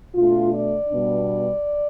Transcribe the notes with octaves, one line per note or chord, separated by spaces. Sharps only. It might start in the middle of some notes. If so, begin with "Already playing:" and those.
B2 A3 D4 F4
D5
B2 G3 B3 D4